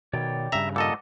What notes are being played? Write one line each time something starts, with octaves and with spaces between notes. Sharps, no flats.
B2 D#3 C#5 D5 G5
G2 C#3 E5 A#5
A#2 A4 D#5 F#5 D6 E6